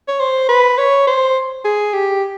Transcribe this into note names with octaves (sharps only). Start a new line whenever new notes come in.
C#5
C5
B4
C#5
C5
G#4
G4